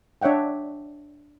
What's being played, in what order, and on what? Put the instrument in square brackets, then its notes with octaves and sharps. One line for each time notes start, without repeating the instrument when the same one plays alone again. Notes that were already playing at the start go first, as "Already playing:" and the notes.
[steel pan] D4 C#5 E5 F#5 G5